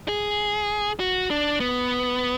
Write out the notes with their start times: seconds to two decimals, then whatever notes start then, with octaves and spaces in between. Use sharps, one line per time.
0.08 G#4
1.00 F#4
1.30 D4
1.60 B3